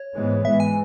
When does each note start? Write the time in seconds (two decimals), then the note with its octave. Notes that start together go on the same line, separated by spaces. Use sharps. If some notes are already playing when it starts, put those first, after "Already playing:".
Already playing: C#5
0.15 G#2 E3 G#3 B3
0.44 G#2 E3 G#3 E5
0.60 G#5